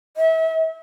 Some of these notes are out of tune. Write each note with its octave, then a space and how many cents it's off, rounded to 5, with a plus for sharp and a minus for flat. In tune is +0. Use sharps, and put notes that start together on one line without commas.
E5 -30